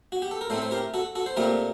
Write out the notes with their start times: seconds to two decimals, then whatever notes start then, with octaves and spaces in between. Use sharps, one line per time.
0.12 F#4
0.22 G4
0.31 A4
0.41 A#4
0.50 A2 A3 C4 A4 C5
0.62 C5
0.71 G4 A#4
0.94 F#4 A4
1.15 F#4 A4
1.26 C5
1.36 A#2 A3 C4 G4 A#4